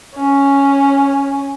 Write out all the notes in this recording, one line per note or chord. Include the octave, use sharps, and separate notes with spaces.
C#4